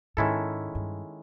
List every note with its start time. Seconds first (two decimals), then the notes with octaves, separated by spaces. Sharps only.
0.17 G#2 D#3 G#3 C#4 E4 A4
0.75 G2